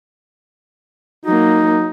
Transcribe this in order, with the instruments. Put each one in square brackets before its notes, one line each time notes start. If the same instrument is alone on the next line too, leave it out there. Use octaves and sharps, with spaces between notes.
[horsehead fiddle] F#3 A#3 [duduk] D#4